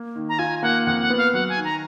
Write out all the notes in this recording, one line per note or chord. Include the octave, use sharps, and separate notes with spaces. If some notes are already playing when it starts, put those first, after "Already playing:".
Already playing: A#3
D#3
A#5
F4 G#5
A#3 F#5
F2 F#5
F#5
B3
F5
F#3 F#5
G#5
D#3
A#5